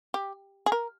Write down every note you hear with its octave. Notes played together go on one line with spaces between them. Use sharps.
G4
G#4
A#4